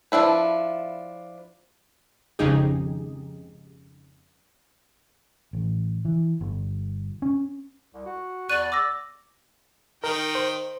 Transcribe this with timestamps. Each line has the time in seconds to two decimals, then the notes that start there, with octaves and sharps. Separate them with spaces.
0.12 F3 D4 E4 B4
2.39 G#1 F2 C#3 D#4 G4 G#4
5.53 A1
6.05 E3
6.41 G1
7.22 C#4
7.94 C2
8.06 F#4
8.49 E2 D5 C#6 F#6 D#7
8.72 D6 E6 A#6
10.04 D#3 A#4 G5
10.35 C5